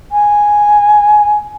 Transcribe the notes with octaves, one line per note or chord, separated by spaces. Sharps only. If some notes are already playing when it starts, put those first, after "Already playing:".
G#5